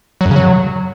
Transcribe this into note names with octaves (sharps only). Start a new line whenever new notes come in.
F#3
F#2
C#3
F#3